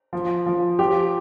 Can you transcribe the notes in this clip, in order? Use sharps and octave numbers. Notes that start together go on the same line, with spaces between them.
F3
F3
F3 G4